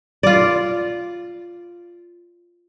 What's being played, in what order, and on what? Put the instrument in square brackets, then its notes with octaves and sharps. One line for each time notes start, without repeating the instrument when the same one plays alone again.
[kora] F4 D5